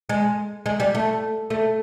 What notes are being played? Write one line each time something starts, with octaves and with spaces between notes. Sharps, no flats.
G#3
G#3
G3
A3
A3